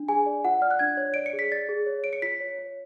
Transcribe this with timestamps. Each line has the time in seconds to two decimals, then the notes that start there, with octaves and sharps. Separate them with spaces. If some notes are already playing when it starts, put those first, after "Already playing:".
Already playing: D4
0.09 G#4 G#5
0.26 D5
0.45 F4 F#5
0.62 D5 F6
0.71 F#6
0.79 D4 G#6
0.97 C#5
1.14 D5 D7
1.26 C#7
1.33 G#4
1.39 B6
1.52 D5 A6
1.69 G#4
1.86 C#5
2.04 C#5 D7
2.13 C#7
2.22 F4 B6
2.40 C#5
2.59 C#5